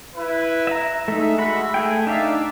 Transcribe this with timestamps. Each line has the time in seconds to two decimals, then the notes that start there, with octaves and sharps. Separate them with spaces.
0.16 E4 B4
0.67 E5 A#5
1.08 G#3 A3 D#4 E5
1.38 F#4 B5
1.74 A3 G#4 G5
2.07 D4 D#4 D5 E5 F5